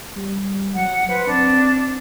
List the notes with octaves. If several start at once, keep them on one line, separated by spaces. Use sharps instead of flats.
G3
F#3 F#5
B4 C5
C4 D4